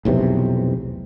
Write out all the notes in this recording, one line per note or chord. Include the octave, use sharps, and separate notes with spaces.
F1 B1 E2 C3